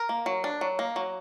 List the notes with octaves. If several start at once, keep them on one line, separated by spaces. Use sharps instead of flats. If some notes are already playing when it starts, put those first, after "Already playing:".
Already playing: A#4 A#5
A#3
F#3
D4
F#3
A#3
F#3